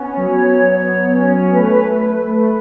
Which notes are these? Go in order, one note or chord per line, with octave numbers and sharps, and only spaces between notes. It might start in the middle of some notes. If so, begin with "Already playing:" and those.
Already playing: B3 C#4
F#3
C#5
F#3
C#5
C#4
A3 B4
B4
A3 B4